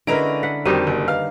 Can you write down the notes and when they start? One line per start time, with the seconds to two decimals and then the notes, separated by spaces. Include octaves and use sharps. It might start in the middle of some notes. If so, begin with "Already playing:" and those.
0.07 D3 G#3 C#4 E4 A#4 B4 A#5 D7
0.43 F#5 B6
0.66 F2 D#3 G3 D#4 F#4 A#4 C5 D#7
0.87 F#1 D5
1.08 B4 D#5 F5 F6